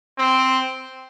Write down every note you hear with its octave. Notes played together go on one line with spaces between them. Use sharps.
C4